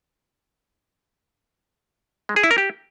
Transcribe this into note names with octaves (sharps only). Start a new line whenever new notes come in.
G#3
G#4
E4
A#4
G4